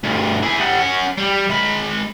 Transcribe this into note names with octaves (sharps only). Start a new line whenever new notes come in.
D2 G2
E4 G#4
G3 F#5
C#4 F#5
G3
G#3 B5